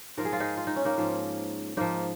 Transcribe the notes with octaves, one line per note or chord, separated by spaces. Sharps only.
G#2 F3 A#4
G#4
F4
D#4 G#4
F4
D#4
C#4
A#3 D#4
G#2 F3
G#2 F3 A#3 D#4